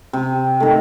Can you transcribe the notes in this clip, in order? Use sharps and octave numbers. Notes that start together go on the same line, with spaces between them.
C3
D#3 A3